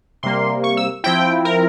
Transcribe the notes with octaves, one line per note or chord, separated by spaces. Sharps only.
C3 G3 A#3 C6
C#6
E6
F3 C4 E4 G5
A#4